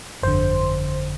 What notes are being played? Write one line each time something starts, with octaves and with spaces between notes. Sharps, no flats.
G1 F2 D3 C5